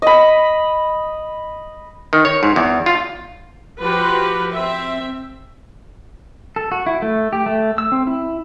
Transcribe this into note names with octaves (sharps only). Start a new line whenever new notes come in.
D#5 B5
D#3
C#5
G#2
E2
F4
F3 F#4 G4 B4
C4 E5
A4
F#4
E4
A3
G4
A3
E6
C4
E4